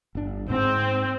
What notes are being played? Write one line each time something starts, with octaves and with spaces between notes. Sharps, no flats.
G1 D4
G#2 C4